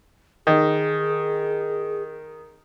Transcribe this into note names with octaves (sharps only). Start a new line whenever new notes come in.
D#3 G#4